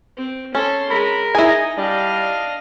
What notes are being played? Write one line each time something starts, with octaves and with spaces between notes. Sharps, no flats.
C4
C#4 A4 C6
G#3 A#4 B5
D#4 E4 G#4 D#5 G#5
G3 D4 D#5 F5